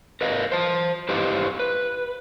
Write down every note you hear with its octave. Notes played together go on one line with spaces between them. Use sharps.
A#4 B4 D#5 F5
C5 A5
E4 G4 B4 C5 D#5 F5
B4